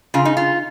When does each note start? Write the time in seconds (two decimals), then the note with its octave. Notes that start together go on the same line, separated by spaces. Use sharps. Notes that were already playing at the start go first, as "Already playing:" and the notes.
0.14 C#3 F4
0.25 D#4
0.37 F4